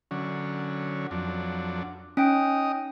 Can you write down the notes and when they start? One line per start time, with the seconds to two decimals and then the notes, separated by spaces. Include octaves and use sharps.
0.11 D3 F#3 C#4
1.11 F2 F#3 D4
2.17 C#4 D#4 D#5 G5